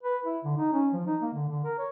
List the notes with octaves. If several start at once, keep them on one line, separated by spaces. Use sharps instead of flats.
B4
E4
D3
D#4
C#4
F3
D#4
A#3
D3
D3
A#4
C#5